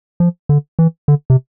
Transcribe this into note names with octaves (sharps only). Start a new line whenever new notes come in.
F3
D3
E3
D3
C3